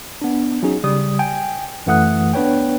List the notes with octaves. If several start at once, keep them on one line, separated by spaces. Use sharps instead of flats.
B3 D4
F#3 C#4 D#4 G#4
C#3 G3 D#6
G5 G#5
F#2 E3 A3 F#5 D#6 F#6
B3 D4 B4 C#5 G5